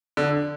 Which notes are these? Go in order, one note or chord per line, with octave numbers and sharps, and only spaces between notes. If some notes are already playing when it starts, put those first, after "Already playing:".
D3